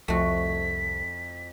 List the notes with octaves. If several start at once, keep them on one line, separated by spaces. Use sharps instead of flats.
C2 F2 A3 F#4 B6